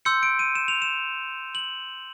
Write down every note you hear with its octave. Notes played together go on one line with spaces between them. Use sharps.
C6 E6 G6 C#7
D7
D#7
E7
F7
E7
F#7